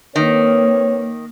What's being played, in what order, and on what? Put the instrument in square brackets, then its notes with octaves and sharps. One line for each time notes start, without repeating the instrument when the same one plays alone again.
[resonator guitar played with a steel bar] D#3 [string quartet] A#3 [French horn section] C4 B4 C#5